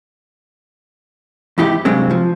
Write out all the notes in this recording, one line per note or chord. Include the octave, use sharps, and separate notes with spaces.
E2 G#2 E4 G4
C2 G2 F#3 G#3 C4
F3